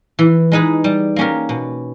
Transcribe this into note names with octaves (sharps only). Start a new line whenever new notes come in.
E3
G#3 D#4 G#4 B4
G3
A#3 C#4 G4 A#4
B2